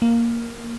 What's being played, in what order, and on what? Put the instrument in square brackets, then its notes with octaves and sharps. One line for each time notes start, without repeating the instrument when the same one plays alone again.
[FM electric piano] A#3